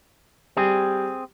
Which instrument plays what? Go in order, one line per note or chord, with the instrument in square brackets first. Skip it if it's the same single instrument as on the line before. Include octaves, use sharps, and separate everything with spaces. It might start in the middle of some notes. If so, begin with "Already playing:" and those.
[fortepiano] G3 [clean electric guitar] C4 G#4